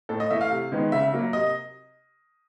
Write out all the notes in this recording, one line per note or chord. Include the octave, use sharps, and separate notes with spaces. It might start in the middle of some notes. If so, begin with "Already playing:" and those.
A2 A4
D#5
E3 A3 E5
F5
C3
D#3 G#3 B3
C#3 E5
F#3 A#3
C3 D#5